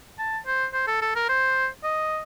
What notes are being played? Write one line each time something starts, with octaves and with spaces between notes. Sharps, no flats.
A5
C5
C5
A4
A4
A#4
C5
D#5